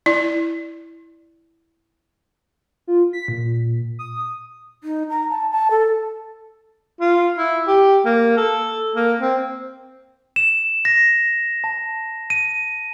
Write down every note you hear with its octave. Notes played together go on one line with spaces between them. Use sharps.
E4 D5
F4
B6
A#2
D#6
D#4
A#5
A5
A5
A4
F4
E4
G4
A#3
A4
A#3
C4
E7
A#6
A5
D#7